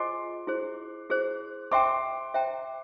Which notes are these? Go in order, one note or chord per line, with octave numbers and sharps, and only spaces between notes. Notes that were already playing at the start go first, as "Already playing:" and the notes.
Already playing: F4 G#4 C5 D#5 G#5 C6 D6
E4 G#4 C5
E4 G#4 C5
C5 E5 G5 A#5 C6 D6
C5 E5 G5 A#5